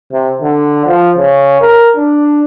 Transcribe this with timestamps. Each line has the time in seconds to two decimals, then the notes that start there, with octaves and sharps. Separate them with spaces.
0.12 C3
0.42 D3
0.86 F3
1.17 C#3
1.61 A#4
1.96 D4